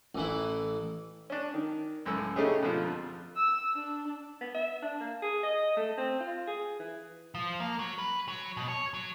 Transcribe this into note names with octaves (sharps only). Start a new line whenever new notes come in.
A1 E3 E4
C#4 D4
D#3
C#2 F#2 A2 E6
C#3 A3 C#4 D#4 G4 G#4
B2 D3 F3 F4
F2
E6
D4
B3
E5
D4
A#3
G#4
D#5
A3
C4
F4
G#4
E3
F3
A#3
F#3
B4
F#3
B2
C#5
F#3